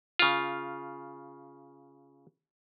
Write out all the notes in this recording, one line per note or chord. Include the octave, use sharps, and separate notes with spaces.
C#3 F4